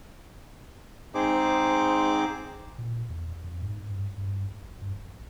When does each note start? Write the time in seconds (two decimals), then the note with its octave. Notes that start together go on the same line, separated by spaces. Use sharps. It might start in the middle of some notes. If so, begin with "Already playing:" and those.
1.15 G#2 C4 D#4 G#4 C5 D6
2.55 G#1
2.78 A#2
3.09 E2
3.44 F2
3.62 G#2
3.89 G2
4.18 G2
4.51 A1
4.81 G2
4.96 E1
5.08 A#1